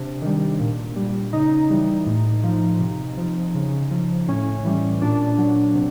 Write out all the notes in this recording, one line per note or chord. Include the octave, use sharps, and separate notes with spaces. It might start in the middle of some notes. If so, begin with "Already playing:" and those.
Already playing: C3 D4
D#3 G3
A#2
G3
C#3 D#4
E3 G3
A2
F3
C3
F3
C#3
F3
A2 C#4
E3 G3
A#2 D4
F#3
C3